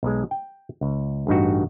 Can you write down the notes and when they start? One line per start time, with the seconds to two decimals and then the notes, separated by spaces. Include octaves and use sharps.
0.03 B1 G#3
0.31 G5
0.81 C#2
1.27 A1 G2 D#4 F#4